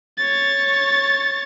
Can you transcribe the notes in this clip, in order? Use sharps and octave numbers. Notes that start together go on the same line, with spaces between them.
C#5 A6